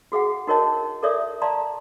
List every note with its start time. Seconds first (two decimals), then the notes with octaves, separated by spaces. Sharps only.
0.12 F#4 G#4 F5 F#5
0.47 D#4 F#4 A#4 C#5 D#5 A5
1.03 A4 A#4 C#5 D5 E5 D#6
1.42 D5 F5 A5 A#5 C6